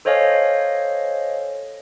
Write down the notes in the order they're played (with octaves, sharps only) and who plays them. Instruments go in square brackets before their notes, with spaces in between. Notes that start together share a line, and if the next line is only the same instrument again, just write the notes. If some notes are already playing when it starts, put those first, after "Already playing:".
[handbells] A4 C5 C#5 D#5 F5 G#5